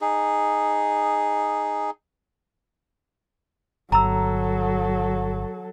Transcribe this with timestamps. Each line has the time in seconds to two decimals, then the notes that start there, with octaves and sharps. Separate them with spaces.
0.01 D#4 G#4
3.92 G1 F#3 A4 A#5 B5 E6